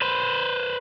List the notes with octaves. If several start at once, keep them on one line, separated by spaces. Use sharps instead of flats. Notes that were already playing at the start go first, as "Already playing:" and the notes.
B4 C5